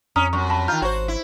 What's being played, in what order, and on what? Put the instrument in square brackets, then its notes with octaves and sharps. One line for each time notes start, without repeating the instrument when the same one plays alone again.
[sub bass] F2 [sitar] C#4 [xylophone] A#5 D#6 F6
[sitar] F#2 [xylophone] C#6
[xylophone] A5 B5
[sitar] D#3 F4 [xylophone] A#5 F6 G6
[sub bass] G#1 [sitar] F#4 C5 [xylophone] C#5 C#6
[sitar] E4